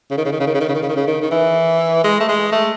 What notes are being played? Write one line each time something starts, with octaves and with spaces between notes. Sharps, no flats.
C#3
D#3
C#3
D#3
C#3
D#3
C#3
D#3
C#3
D#3
C#3
D#3
C#3
D#3
D#3
E3
G#3
A3
G#3
A3